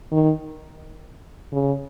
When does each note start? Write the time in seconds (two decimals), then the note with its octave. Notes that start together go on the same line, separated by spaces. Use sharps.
0.12 D#3
1.52 C#3